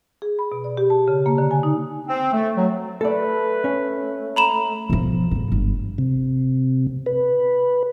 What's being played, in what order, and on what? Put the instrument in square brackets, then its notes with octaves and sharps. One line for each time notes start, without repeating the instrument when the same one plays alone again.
[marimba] G#4
B5
B2
D5
G4
A5
C#3
A#3
D3
G#5
D#4
[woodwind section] C4
A3
F#3
[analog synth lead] A3 [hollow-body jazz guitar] A4 D5 [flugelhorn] B4
[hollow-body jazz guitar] C#4
[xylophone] A#5 B5 E7
[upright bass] B1 F3
G#2 B2
G1 G#3
[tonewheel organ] C3
B4